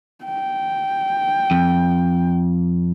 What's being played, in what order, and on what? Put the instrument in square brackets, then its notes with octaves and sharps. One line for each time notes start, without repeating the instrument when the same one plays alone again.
[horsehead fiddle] G5
[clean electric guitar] F2